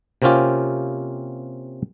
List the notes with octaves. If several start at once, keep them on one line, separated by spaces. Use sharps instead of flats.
C3 A#3 C4 C#4 F4 G4